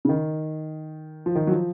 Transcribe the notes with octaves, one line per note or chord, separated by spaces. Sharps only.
C#3
D#3
F3
D#3
F#3
F3